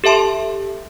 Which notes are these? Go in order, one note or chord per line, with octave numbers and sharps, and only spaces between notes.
G4 A4 E5 A5 C6